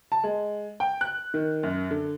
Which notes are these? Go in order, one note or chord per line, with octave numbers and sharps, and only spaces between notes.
A5
G#3
G5
F#6
D#3
F#2
D3